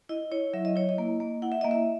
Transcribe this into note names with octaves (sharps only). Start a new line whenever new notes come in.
E4 D#5
E4 C#5
F#3 E5
D#5
E4 C#5
D#5
A#3
A#3
E4 F#5
E5
A#3 D#5
E5